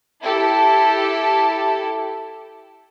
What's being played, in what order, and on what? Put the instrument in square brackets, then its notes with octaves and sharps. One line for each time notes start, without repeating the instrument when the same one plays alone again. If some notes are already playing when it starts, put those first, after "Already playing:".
[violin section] E4 G4 A4 A5